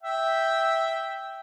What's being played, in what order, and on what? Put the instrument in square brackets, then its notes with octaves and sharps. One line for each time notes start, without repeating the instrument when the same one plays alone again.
[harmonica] E5 G5